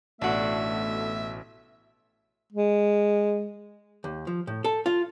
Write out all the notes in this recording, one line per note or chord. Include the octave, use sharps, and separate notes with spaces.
A1 B2 A3 D4 F#4 E5
G#3
D#2
F3
A2
A4
F4